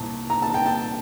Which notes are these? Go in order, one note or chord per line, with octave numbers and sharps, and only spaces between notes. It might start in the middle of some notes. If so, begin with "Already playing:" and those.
Already playing: C2 A#2 A5
A#5
A5
G5
A5